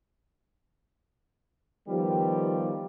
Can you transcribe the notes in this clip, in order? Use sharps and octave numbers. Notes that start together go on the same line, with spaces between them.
D#3 F3 G3 B3 G4